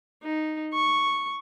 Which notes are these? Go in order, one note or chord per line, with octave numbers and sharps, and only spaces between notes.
D#4
C#6